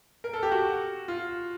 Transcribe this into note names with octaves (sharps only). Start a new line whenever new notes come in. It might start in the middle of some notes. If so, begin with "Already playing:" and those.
A#4
A4
G4
F#4
F4